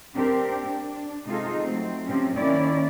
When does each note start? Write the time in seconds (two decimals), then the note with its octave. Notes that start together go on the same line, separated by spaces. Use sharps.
0.14 C4 D4 G4 A#4
0.66 D4
1.25 C3 G#3 D#4 F4 G#4 A4
1.61 F#3 A3 C4
2.06 C3 F3 C4 C#4
2.36 D#3 A#3 C#4 E4 D5